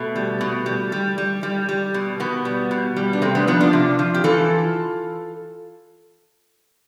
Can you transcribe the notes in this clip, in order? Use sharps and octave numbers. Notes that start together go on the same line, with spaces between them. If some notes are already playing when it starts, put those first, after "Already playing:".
Already playing: B2 A3
G3
B2
G3
G3
G3
G3
G3
B2
B2 B3
G3
B2
G3
D4
C3 A3 C4
B3 D4
F3 B3 D4
D4 F4
C3
F3
G4
E3 F4 A4